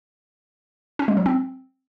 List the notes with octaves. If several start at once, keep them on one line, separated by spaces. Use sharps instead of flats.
C#4
G#3
F#3
C4